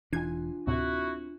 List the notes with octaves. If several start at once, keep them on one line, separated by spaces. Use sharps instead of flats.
E1 E3 D4 D#4 F4 G#5 G#6
D2 A2 C3 C4 E4 F#4